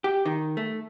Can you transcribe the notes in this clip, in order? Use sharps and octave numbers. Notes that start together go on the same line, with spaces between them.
G4
D#3
A3